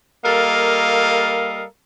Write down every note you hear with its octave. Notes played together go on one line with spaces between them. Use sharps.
G3 A#3 A4 A#4 D#5 F5